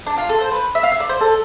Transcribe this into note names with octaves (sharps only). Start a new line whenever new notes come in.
D4
F4
A4
C5
B4
E5
F5
E5
D5
C5
A4